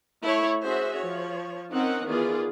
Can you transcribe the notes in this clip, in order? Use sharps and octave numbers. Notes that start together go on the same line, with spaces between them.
A3 E4 C#5
C#4 F#4 G#4 C5 E5
F3 C#5
C4 C#4 D#4 A#4 F#5
D#3 E3 B3 F4 G#4 D5